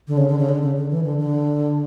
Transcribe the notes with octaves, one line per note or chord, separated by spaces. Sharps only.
D3
C#3
D3
C#3
D3
C#3
D3
E3
D3
D3